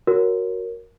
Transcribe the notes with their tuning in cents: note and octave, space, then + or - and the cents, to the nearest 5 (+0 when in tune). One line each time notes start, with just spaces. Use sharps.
F#4 +0 A#4 +0 C#5 +0